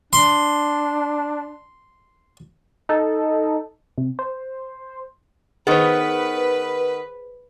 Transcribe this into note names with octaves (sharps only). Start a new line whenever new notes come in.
D4 C6
D#4 A4
C3
C5
D#3 B3 G#4 B4 C5